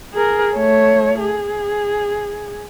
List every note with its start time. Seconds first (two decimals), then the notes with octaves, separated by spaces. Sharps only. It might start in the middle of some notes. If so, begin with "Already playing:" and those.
0.13 G#4 A#4
0.54 A3 C#5
1.21 G#4